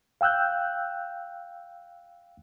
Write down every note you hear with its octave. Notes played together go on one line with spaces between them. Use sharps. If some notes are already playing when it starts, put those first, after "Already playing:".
F5 G5 E6 F#6 G6